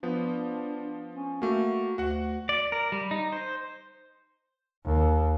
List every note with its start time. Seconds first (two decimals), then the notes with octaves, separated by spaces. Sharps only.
0.03 F3 B3 D4
1.15 C#4
1.42 A3 A#3 F#4
1.98 D2 F#4 F#5
2.49 D5
2.72 A#4
2.92 G3
3.11 D#4
3.32 C5
4.85 D#2